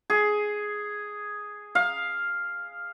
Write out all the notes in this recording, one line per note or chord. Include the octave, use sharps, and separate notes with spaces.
G#4
F5